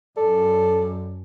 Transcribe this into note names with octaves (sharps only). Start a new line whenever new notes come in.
F#2 A4 D5